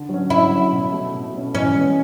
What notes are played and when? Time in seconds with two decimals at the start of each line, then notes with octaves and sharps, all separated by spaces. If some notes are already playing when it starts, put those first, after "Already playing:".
Already playing: D3
0.09 F#3 C#4
0.30 D3 E4
0.51 F#3 C#4
0.72 B2
0.92 A3 C#4
1.13 B2
1.33 A3 C#4
1.54 E3 C#4
1.74 G#3 B3